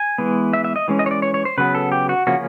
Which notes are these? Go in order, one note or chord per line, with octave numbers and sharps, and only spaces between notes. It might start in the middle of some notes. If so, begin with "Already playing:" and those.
Already playing: G#5
E3 G#3 B3
E5
E5
D#5
E3 G#3 C#4
D#5
C#5
D5
C#5
C#5
C5
C#3 F#3 B3 B4
A4
G4
F#4
C#3 F3 A#3 C#4 F#4